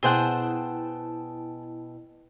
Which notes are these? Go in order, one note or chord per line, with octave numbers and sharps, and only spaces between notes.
B2 E4 G#4 C5 F#5 G5 A5